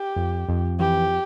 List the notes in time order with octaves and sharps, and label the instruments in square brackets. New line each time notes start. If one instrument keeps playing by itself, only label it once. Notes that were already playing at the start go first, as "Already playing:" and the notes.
Already playing: [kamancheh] G4
[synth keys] F2
F2
[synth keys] E3 [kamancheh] G4